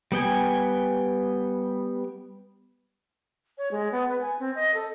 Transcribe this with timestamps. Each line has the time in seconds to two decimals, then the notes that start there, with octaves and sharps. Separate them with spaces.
0.12 G3 B3 G5 G#5
3.58 C#5
3.71 G#3
3.92 B3
4.08 B4
4.21 G#5
4.39 C4
4.55 D#5
4.74 A4